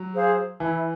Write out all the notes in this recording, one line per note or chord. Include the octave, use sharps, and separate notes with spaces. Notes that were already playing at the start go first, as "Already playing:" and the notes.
Already playing: F#3
G#4 C5 F5
E3 E4